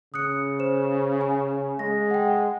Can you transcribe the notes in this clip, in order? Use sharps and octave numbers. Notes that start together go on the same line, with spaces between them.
C#3 D#6 F#6 C#7
C5 E7
G#5
G#3 A#6
F#5 G5